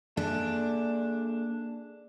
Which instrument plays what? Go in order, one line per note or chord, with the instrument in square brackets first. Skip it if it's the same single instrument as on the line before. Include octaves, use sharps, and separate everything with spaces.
[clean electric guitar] A#3 G#4 A4 [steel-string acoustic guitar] D4